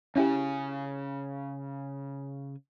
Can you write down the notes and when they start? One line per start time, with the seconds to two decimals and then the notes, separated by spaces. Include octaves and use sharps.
0.16 C#3 C#4 E4 G4 G#5